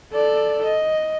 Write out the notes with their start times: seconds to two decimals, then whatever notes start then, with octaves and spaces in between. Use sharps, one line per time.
0.12 A4 D5
0.64 D#5